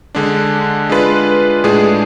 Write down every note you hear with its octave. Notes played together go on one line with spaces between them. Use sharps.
D3 G#3 D4
G#3 D4 F4 B4
A2 G#3 D4 G#4